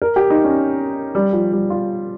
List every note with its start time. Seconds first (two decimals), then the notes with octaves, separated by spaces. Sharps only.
0.02 A#4
0.16 G4
0.30 D#4
0.44 C#4
1.15 G3
1.33 F3
1.52 G3
1.70 F4